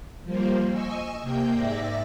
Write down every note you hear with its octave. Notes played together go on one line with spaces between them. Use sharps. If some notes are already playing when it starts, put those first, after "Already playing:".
F3 G3 A#3 C5
D#5 G#5 C#6 E6
C3 A#3 G5 G6
G#2 D5 E5 A#6